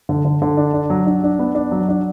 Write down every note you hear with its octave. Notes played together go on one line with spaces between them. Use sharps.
D3
D3
D3
D4
D4
F#3
D4
D4
B3
D4
F#3
D4